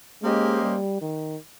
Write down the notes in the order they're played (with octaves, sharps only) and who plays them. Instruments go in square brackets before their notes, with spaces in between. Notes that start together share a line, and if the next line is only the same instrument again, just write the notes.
[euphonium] G#3 [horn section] A#3 C#4 G4 C5 D#5
[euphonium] G3
D#3